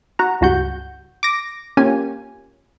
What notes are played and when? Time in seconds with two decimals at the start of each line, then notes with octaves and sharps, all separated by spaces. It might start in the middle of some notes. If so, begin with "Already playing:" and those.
0.19 F#4 A#5
0.41 C#2 G2 F#4 F#5 G6
1.23 D6 A#6
1.77 A#3 C#4 F4 G4 G#5